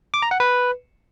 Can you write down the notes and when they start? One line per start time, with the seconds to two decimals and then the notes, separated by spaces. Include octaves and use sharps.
0.14 D6
0.22 A#5
0.31 F#5
0.40 B4